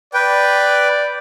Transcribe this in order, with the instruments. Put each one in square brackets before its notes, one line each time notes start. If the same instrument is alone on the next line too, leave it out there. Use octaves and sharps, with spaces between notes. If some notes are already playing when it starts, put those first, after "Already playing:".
[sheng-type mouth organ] B4 G5 [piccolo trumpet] D5